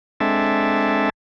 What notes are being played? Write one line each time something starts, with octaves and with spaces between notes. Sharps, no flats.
G#3 C4 D4 A4 E5